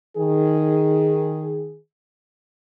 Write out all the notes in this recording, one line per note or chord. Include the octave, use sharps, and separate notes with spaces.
D#3 G#4